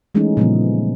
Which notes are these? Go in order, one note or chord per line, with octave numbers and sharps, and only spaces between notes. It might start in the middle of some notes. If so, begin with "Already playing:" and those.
E3 G#3 A3 C#4 D#4 G#4
A#2 C#3 F3 G3 A3 B3